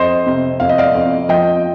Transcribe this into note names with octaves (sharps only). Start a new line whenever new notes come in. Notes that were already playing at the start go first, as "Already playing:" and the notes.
Already playing: F2 C5 D#5
C3
F2 F5
D#5
D5 F5
F2
F3 D#5 G5